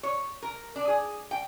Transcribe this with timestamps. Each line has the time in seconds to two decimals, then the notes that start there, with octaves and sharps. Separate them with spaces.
0.03 C#5
0.43 A#4
0.76 D4
0.88 G#4
1.31 G5